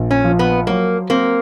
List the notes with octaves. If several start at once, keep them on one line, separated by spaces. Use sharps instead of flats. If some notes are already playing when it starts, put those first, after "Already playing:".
Already playing: A#1
C#4
F3
B3
F#3 A#3
A#3 C4